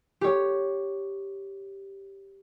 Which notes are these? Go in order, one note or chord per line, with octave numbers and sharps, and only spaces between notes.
G4 C#5